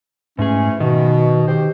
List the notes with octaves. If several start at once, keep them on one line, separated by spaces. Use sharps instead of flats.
G#2 E3 A3 C#4 G#4
B2 D#3
G4 C5